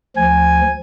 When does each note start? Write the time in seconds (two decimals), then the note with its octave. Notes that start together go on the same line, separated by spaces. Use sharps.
0.17 D2 F3 G#5